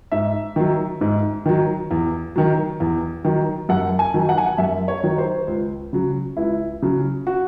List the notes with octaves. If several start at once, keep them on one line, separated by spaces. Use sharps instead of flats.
G#2 E5
D#3 F#3
G#2
D#3 F#3
E2
D#3 F#3
E2
D#3 F#3
F#2 F#5
G#5
D#3 F#3
F#5
G#5
F#5
F#2 E5
C#5
D#3 F#3
C5
C#2
C#3 F#3
C#2 E4
C#3 F#3
F#4